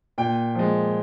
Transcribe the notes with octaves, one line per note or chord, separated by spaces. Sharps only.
A#2 G5
F3 G#3